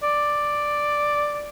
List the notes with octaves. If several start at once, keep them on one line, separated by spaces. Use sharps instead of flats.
D5